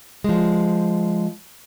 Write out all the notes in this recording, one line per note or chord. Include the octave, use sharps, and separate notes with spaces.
F3 G#3